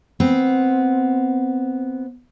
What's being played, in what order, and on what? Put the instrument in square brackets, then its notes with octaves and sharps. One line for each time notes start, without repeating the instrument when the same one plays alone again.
[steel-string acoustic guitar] B3 C4